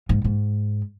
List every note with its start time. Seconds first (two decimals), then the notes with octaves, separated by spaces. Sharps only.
0.09 G#2
0.24 G#2